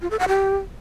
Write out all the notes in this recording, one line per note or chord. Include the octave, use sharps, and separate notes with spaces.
F4
A4
F#5
G4